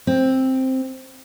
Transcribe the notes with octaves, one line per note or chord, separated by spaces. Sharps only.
C4